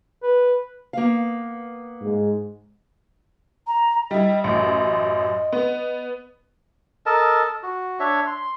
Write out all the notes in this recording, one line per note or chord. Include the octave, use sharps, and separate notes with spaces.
B4
A#3 B3 F5
G#2
A#5
G3 E4 D#5
A1 F#2 D#5
B3
A4 A#4 D#5 A5
F#4
D4 C#5 E5
C6